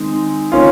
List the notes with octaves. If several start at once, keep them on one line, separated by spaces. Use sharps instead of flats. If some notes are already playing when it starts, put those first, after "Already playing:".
Already playing: D#3 G#3 C4
D#3 A#3 C#4 F4